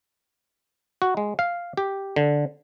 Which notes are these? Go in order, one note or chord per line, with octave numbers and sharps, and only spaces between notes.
F#4
G#3
F5
G4
D3